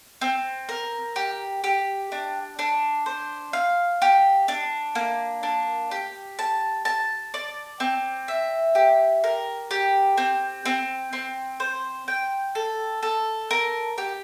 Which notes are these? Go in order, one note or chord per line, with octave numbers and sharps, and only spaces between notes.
C4
A#4
G4
G4
D4
D4
C5
F5
G4
D4
A#3
D4
G4
A5
A5
D5
C4
E5
G4
A#4
G4
C4
C4
C4
C5
G5
A4
A4
A#4
G4